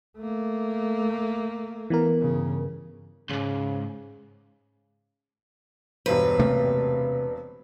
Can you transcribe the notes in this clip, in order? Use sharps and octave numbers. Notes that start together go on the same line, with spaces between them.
A3 A#3
E3 B3 A#4
G2 C#3
C2 G#2 C#3
E1 G2 B4 C5
C3 A3 A#3